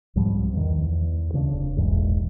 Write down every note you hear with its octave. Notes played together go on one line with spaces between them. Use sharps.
C2 G#2 F3 G3
E2 D#3
E2
D2 C#3 C4 D4
F1
E1 A#1 E2 G#2